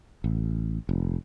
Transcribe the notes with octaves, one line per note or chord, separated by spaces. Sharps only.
A1
F1